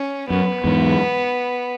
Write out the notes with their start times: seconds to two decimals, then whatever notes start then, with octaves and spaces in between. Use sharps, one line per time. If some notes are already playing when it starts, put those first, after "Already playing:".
Already playing: C#4
0.30 F#2 B3
0.64 E2 G#2